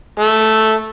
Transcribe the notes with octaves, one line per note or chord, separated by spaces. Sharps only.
A3